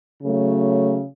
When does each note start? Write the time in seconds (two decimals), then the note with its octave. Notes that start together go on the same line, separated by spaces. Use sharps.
0.22 C#3 F#3 A3